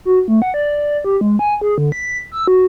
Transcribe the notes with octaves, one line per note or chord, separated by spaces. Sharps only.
F#4
A3
F#5
D5
G4
G#3
G#5
G#4
D3
B6
E6
F#4